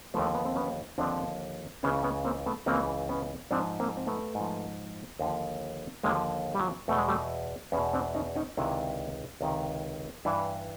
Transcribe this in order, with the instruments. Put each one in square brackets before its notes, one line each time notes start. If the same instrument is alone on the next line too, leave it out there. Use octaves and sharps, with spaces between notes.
[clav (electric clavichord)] D#2 D3 F3 A3 B3
B3
C4
B3 C#4
D#2 D3 F3 C4 D4
C#2 C#3 E3 B3 C#4
B3 C#4
A#3 C4
A3 B3
C#2 C#3 E3 A#3 C4
B3 C#4
G#2 F3 C4 D4
A#3 C4
C4
A3 B3
G#2
F3
D#2 D3 F3
D#2 D3 F3 G#3 A#3
G3
F#3
E2 B2 A3
G#3
G3 A3
E2 B3 C#4
B2
C4 D4
C#4 D#4
C#4 D#4
C#2 C3 D#3 D4 E4
C#2 C3 D#3
G2 E3 D4 E4